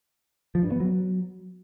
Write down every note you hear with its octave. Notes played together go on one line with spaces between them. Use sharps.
F3
G2
B3
F#3